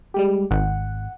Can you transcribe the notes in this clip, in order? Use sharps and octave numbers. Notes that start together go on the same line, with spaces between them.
G3 G#3 G4
G#1 F#5